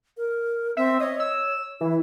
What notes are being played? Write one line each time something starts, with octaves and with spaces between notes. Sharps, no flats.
A#4
C4 E5
C#5 D#5
E6
E3 E4